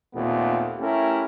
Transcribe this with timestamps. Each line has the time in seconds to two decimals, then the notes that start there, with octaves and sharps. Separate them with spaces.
0.15 D#2 A#2 A3 B3 C4
0.79 A3 C#4 E4 G4 A#4